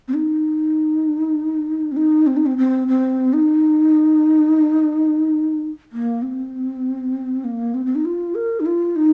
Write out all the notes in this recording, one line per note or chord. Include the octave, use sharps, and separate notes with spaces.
C4
D#4
C4
D#4
C4
D#4
C4
C4
C4
D#4
A#3
C4
A#3
C4
C4
D#4
F4
A#4
D#4
F4
D#4